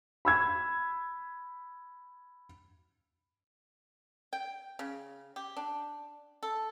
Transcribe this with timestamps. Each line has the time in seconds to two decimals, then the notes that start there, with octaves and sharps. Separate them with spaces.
0.25 B5 E6 G#6
4.33 G5
4.79 C#3
5.36 G4
5.57 D4
6.43 A4